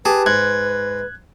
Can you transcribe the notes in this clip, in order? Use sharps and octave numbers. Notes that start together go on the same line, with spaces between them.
G4 G#4 B4 A5
G#2 F#6 G#6